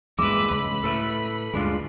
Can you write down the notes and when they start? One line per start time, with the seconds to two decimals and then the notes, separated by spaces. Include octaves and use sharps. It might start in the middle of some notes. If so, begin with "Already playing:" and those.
0.19 E2 G2 A#2 G#3 B4 D6 E6
0.50 C#2 B5
0.84 A2 A4 B4 E5
1.54 D2 G2 G#3 D4 F4